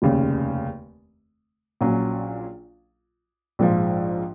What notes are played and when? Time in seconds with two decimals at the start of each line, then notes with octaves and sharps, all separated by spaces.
0.02 F1 D#2 C#3
1.81 A#1 A#2 F#3 C#4
3.59 A#1 G#2 F3